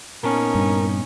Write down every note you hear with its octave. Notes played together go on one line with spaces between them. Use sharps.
A#2 B3 C#4 D#4 A#4 A5
G2